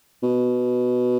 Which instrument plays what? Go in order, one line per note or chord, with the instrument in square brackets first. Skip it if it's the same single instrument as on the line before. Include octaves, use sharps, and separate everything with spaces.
[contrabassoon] B2